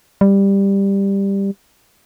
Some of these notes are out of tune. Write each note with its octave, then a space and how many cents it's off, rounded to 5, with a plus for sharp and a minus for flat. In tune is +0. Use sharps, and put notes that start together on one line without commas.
G3 +10